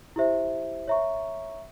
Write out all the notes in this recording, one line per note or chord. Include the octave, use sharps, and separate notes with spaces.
E4 G4 C5 E5
C#5 E5 A#5 C#6